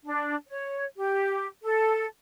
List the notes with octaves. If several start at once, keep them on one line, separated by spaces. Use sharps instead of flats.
D4
C#5
G4
A4